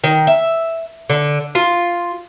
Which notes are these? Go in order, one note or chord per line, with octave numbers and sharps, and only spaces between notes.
D#3
E5
D3
F4